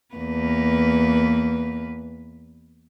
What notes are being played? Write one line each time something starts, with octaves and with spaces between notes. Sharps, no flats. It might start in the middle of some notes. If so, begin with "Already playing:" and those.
E2 A#3 B4